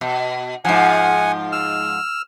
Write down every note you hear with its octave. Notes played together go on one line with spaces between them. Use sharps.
B2
G#2 F3 F#5 G#5
E6 F6